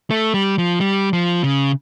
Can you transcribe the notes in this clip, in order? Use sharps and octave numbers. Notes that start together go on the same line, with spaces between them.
A3
G3
F3
G3
F3
C#3